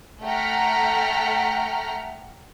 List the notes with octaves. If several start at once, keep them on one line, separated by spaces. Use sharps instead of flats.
A3 F#5 G5 A#5 F6 B6